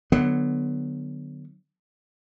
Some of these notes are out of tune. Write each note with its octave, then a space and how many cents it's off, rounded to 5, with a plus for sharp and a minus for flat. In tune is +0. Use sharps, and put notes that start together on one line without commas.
D3 +30 F#3 +0 B3 +0